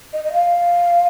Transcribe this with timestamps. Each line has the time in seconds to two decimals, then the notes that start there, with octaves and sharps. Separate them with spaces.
0.13 D#5
0.24 D#5
0.33 F5